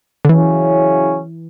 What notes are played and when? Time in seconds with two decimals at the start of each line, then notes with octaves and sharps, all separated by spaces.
0.25 D3
0.29 C#3 E3 F#3 C#4 E4